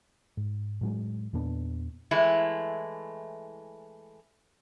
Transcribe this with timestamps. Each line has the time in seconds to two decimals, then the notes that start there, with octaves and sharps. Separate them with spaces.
0.37 G#2
0.81 A2 F#3 G#3
1.33 E2 A#2 B3 D4
2.11 E3 G#3 A3 E4